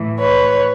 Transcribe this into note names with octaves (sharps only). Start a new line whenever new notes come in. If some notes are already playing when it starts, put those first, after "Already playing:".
Already playing: A2 E3
B4 C#5